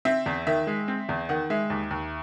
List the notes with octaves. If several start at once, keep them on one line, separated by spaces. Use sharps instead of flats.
C4 E5
E2
D#3 E5
G#3
C4
E2
D#3 F#5
G#3 E5
D#2
D#2